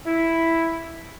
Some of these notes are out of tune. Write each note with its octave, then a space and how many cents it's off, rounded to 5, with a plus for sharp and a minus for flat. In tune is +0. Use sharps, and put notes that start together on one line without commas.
E4 +0